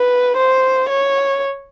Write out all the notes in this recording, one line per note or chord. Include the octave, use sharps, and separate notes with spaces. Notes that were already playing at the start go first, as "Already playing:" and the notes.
Already playing: B4
C5
C#5